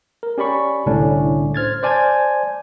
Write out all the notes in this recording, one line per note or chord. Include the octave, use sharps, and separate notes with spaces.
A#4
C#4 G4 D5 B5 C#6
C2 A2 D3 C#4 D4
C5 F6 G#6 A6
C5 D5 G#5 A5 G6 G#6